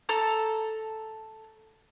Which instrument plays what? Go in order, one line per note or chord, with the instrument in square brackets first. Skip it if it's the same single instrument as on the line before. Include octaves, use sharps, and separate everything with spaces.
[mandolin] A4 A#5 E6